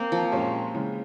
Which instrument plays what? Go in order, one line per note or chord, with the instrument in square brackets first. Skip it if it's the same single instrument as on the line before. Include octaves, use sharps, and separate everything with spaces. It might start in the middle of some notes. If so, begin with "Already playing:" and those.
Already playing: [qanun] A#3 C4
F3
[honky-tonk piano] A#2 G#3 C#4 G4 C#5
C#3 E3 G#3